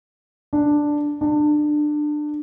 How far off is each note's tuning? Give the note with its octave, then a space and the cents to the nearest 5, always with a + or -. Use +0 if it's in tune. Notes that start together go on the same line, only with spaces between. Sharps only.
D4 +5
D4 +25